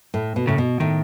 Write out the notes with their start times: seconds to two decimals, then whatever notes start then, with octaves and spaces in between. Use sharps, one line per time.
0.14 A2
0.36 B2
0.47 A2 C#3
0.58 B2
0.80 A2 D#3